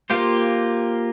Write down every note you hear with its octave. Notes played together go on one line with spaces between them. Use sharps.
A#3 F4 G4 C5